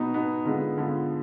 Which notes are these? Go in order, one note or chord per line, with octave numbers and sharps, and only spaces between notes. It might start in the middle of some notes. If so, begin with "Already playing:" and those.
Already playing: B2 B3 D#4
B2 B3 D#4
D3 G#3 B3 F4
D3 G#3 B3 F4